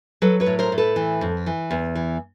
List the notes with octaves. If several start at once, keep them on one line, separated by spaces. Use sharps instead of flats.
F#3 A4 B4
B4 C#5
A2
A#4 C5
A2
A4 B4
E3
F2
E3
E2
E3